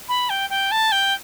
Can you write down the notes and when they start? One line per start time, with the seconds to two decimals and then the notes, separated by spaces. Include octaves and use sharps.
0.08 B5
0.29 G5
0.50 G5
0.71 A5
0.92 G5